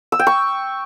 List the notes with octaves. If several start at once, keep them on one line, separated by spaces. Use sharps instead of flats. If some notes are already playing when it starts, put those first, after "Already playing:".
E6
G5
C#6